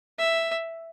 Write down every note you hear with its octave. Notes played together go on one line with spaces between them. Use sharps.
E5